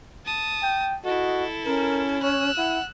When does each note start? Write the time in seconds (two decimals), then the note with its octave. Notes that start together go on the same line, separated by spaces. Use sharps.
0.25 A5 D#6
0.62 G5
1.05 E4 F#4 A4 D#5
1.66 C#4 A#4
2.22 C#5 E6 F#6
2.57 E4 F#5